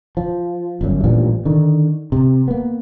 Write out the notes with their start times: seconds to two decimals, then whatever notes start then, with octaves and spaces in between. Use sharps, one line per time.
0.17 F3
0.81 G1 F#2
1.04 A1 G2 A#2 F3
1.45 D3 D#3
2.12 C3
2.48 A#3 B3